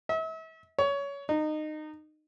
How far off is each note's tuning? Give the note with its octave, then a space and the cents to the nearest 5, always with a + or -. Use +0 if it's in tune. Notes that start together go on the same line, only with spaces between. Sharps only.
E5 -40
C#5 +20
D#4 -20